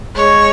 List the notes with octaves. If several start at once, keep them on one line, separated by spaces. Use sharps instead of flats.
G#3 C#5